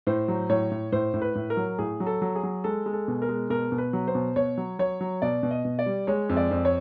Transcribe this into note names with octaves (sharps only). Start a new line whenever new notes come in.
A2 C5
F#3
A2 C#5
A2
A2 C5
A2
B4
A2
A#4
F#3
A2 G#4
F#3
A4
F#3
G#4
F#3
G#3 A4
G#3
A4
B2
A#4
G#3
B2 A#4
B2
B4
F#3
C5
B2
B2 C#5
F#3
F#3 C#5
F#3
B2 D5
B2
D#5
B2
D5
G3
G#3 C#5
F2
D5
F2
C#5